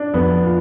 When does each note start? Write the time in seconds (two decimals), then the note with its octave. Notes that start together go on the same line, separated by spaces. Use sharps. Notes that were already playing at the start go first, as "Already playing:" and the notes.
Already playing: D4
0.14 F2 B3
0.44 A#2